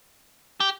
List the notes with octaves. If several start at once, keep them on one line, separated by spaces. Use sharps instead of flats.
G4